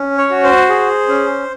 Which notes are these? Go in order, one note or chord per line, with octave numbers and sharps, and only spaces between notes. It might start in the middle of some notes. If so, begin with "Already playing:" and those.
Already playing: C#4
C#5
F#4
C5
G#4
C#4